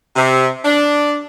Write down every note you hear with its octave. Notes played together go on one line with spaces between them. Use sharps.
C3
D4